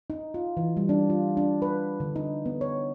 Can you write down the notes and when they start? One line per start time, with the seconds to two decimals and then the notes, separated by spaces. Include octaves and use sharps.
0.10 D#4
0.34 F4
0.57 E3
0.77 G3
0.89 D4
1.10 F4
1.37 D4
1.62 B4
2.00 D3
2.16 D#4
2.46 B3
2.61 C#5